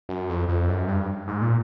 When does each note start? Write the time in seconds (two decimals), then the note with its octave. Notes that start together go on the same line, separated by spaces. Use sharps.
0.09 F#2
0.29 F2
0.49 F2
0.68 F#2
0.88 G2
1.28 G#2
1.42 A#2